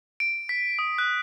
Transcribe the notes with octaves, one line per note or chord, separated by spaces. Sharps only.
D7
B6
D#6
F#6